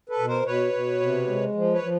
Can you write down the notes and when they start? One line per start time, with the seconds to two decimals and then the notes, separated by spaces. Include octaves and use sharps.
0.09 A4 B4
0.19 B2
0.27 A#4 C5
0.45 B2 B4 C#5
0.73 B2
1.00 C3
1.27 G#3
1.55 F3
1.73 B4 C#5
1.82 F3